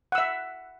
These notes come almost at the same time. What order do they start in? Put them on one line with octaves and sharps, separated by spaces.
F#5 E6 E5